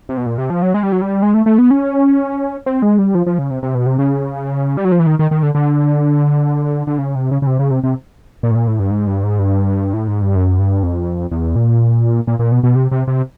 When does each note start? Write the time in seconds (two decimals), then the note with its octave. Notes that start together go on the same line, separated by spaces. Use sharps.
0.09 C3
0.17 B2
0.26 A#2
0.38 C3
0.50 F3
0.62 F#3
0.74 G#3
0.83 G3
0.92 F#3
1.02 G3
1.22 G#3
1.34 A3
1.46 A3
1.58 B3
1.71 C#4
2.66 C4
2.82 G#3
2.99 G3
3.15 F3
3.26 F3
3.39 C#3
3.51 C3
3.63 C3
3.75 B2
3.86 C3
3.98 C#3
4.77 G3
4.85 F#3
4.92 F3
4.99 E3
5.07 D#3
5.19 D#3
5.31 D#3
5.43 D3
5.55 D3
6.87 D3
6.98 C#3
7.15 C3
7.31 C#3
7.42 C#3
7.47 C3
7.59 C#3
7.71 C3
7.83 C3
8.43 A#2
8.51 A2
8.55 A#2
8.67 A2
8.79 G2
8.91 G#2
9.07 G2
9.23 G#2
9.39 G2
9.94 A2
10.08 G#2
10.22 G2
10.35 F#2
10.59 G2
10.83 F2
11.32 E2
11.56 A#2
12.27 A#2
12.39 A#2
12.52 B2
12.63 B2
12.75 C3
12.91 C3
13.08 C3